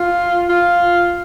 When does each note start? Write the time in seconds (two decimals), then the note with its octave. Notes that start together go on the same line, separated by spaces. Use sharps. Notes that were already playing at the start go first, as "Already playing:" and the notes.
Already playing: F4
0.49 F4